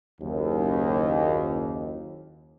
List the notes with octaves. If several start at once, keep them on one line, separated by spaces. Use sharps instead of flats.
F#1 D#2